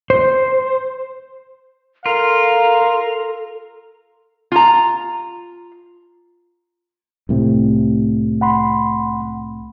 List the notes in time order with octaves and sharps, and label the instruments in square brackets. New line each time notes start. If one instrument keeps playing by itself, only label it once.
[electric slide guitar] C5
[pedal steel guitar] F4 [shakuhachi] A4 [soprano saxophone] A#4 [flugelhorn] F5
[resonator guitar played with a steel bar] F4 A#5
[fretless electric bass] C2 A2 C3
[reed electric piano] F#5 B5 C6